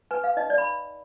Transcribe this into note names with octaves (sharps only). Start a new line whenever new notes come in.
B4 G#5
F5
D#4 D#5
D5
B5